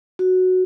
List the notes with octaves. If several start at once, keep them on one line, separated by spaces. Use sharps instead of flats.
F#4